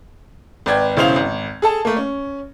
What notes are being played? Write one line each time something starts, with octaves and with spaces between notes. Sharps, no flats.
G#1 B4 D5 G5 G#6
E1 C#3 E4 C5 F5 F7
G#1
G#4 A4 A5
A3 A#3
C#4